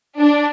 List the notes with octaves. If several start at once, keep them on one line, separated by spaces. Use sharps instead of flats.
D4